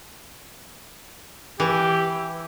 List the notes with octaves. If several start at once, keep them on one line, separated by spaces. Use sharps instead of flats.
E3 G4